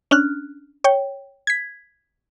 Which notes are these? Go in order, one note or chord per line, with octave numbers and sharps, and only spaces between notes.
C#4 D4 F6 F#6
C#5 G5
G#6 B6